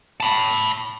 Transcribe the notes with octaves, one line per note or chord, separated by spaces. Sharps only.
A5 B5